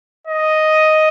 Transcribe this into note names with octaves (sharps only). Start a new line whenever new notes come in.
D#5